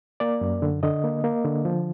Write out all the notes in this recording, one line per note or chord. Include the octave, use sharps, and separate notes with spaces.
A#3 D5
F#2
D3
D3 D#5
A#3
A#3
D3
F3